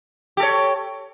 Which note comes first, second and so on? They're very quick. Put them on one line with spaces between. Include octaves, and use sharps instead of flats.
G4 A4 C#5